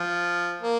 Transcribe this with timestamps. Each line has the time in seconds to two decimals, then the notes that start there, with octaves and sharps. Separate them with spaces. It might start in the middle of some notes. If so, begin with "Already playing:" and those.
Already playing: F3
0.62 A#3